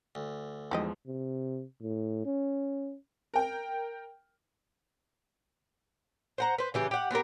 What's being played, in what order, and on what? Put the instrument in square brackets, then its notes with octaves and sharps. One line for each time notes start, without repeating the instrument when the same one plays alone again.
[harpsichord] D2
[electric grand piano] E2 F3 G#3 [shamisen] D#4 G4 D#5
[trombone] C3
A2
C#4
[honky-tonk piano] A#4 G5
[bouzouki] C5 F#5 A#5
B4 C5
C#3 E3 G4
G4 F#5
B3 C4 G4 A#4